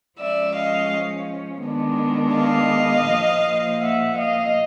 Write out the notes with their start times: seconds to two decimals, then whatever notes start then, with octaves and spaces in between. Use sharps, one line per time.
0.18 F3 G#3 C#4 D5 E5
0.54 D#5 F5
1.64 D#3 G#3 B3 D4
2.36 D#5 F5
3.09 A#2 F3 A#3
3.81 E5 F#5
4.18 D#5 F5